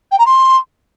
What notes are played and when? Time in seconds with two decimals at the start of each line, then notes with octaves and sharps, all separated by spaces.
0.11 G5
0.18 A#5
0.25 C6